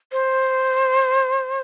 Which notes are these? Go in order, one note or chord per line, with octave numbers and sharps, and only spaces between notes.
C5